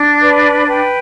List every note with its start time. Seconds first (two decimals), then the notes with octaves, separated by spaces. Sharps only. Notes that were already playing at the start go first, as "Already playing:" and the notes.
Already playing: D4
0.23 B4 D5
0.68 B4 G5